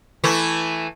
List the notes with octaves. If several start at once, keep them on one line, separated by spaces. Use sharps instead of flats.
E3 A3 E4